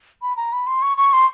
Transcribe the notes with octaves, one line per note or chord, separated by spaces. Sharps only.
B5
A#5
B5
C6
C#6
C#6
C6